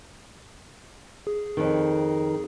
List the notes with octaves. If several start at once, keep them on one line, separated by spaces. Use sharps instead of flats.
G#4
F2 D#3